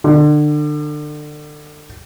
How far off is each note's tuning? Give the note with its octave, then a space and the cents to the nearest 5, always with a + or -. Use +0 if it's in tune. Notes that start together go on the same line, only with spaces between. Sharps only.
D3 +30